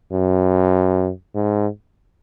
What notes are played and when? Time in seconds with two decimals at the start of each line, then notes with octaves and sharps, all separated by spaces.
0.12 F#2
1.35 G#2